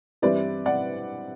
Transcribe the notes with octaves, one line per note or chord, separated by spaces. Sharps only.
G2 E3 G3 C4 E4 B4 D5
D5 F#5